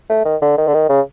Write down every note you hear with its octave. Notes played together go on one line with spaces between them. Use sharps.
A3
D#3
D3
D#3
D3
D#3
C#3